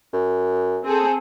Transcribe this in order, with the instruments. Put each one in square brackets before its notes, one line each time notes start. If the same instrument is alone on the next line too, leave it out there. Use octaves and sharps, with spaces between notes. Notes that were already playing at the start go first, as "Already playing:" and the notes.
[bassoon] F#2
[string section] C4 G#4 A4